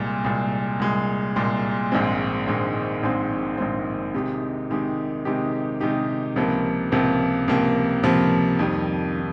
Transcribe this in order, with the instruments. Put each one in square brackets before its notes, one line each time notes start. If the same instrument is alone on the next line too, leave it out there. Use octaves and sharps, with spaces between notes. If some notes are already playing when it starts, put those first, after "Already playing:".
Already playing: [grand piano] C2 A#2 G#3
C2 A#2 G#3
C2 A#2 G#3
C2 A#2 G#3
A#1 G#2 D#3 G#3 C4
A#1 G#2 D#3 G#3 C4
A#1 G#2 D#3 G#3 C4
A#1 G#2 D#3 G#3 C4
C3 D#3 G#3 D#4 G4
C3 D#3 G#3 D#4 G4
C3 D#3 G#3 D#4 G4
C3 D#3 G#3 D#4 G4
C#2 C3 F3 A#3
C#2 C3 F3 A#3
C#2 C3 F3 A#3
C#2 C3 F3 A#3
F2 D#3 G3
D#3